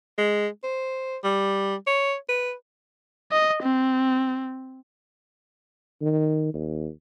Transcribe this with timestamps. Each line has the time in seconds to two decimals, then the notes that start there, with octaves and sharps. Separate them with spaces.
0.18 G#3
0.64 C5
1.24 G3
1.87 C#5
2.29 B4
3.32 D#5
3.63 C4
6.02 D#3
6.54 D#2